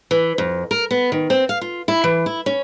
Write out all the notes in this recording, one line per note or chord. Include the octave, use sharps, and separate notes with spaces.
E3
F2
A#4
B3
D#3
C4
F5
F4
E4
E3
E4
C#4